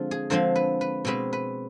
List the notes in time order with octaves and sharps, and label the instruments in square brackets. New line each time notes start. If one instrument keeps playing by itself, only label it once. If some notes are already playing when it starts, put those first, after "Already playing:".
Already playing: [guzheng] D3 F3 G#3 C4 F4
G#4
D3 F3 G#3 C4 C5
B4
B4
B2 G#3 C4 B4
B4